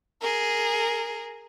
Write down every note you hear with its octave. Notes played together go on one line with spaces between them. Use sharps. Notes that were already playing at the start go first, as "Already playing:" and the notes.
G#4 A#4